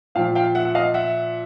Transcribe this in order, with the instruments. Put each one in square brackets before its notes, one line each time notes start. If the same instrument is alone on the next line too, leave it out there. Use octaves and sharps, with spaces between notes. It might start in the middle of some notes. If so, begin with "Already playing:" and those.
[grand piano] A#2 F3 F5 G5
F5 G5
E5 F#5
F#5
D#5 F5
E5 F#5